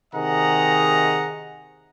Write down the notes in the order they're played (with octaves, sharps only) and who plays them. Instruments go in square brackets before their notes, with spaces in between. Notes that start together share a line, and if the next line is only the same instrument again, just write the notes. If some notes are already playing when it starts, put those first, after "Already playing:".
[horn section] C3 D#3 G#4 D#5 F#5 A#5